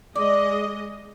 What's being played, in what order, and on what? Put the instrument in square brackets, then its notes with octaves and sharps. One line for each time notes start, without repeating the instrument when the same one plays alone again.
[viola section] G#3 D#5 [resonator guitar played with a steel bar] D5